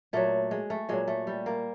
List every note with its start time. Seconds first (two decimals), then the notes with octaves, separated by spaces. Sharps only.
0.13 A#2 F#3 A3
0.51 G#3
0.70 A3
0.89 A#2 F#3 G#3
1.08 A3
1.27 G3
1.46 A#3